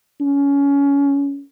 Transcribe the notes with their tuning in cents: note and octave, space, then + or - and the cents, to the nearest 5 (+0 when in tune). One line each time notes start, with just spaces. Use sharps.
C#4 +20